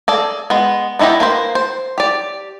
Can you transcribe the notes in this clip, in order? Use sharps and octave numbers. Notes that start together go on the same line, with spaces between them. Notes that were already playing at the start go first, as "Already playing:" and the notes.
G#4 A4 D5
G#3 B3
B3 D#4 E4 G4 D#5
A#3 B4 C5
C5
G4 D5